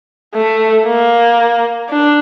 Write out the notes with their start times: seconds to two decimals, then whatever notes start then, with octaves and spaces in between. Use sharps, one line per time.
0.35 A3
0.87 A#3
1.91 D4